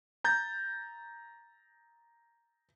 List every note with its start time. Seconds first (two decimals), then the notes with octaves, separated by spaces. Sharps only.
0.24 A#5 G6 A6